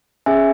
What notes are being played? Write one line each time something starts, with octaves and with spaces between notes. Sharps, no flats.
C#4 G#4 E5 G#5